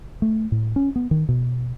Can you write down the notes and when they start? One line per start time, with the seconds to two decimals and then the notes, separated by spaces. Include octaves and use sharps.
0.22 A3
0.52 A2
0.76 C#4
0.96 B3
1.11 D#3
1.29 B2